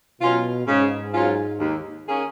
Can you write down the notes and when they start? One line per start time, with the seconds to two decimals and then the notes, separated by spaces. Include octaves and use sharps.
0.21 B2 F#3 C#4 F4
0.67 G#2 C#3
1.14 F#3 C#4 F4
1.60 D#2
2.07 D#3 A#3 C#4 G#4